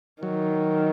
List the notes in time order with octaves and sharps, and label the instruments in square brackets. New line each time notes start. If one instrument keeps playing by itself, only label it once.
[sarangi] D#3 [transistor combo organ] F#3